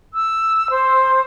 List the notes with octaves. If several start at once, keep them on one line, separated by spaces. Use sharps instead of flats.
E6
C5